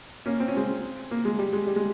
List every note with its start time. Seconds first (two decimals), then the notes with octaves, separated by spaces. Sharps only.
0.26 A#3 C#4
0.40 C4
0.48 C#4
0.57 G#3 C4
1.11 A#3
1.25 G#3
1.39 G3
1.53 G#3
1.67 G3
1.76 G#3